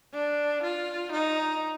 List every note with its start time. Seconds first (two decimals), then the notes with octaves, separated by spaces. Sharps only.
0.13 D4
0.63 F4
1.12 D#4